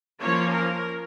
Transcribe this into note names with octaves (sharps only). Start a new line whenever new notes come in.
F3 A#3 C#4 C#5
A#4